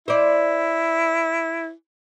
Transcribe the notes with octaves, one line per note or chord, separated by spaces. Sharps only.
E4 C5 D5